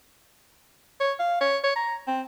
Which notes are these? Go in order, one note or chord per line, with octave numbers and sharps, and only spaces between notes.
C#5
F5
C#5
C#5
A#5
C4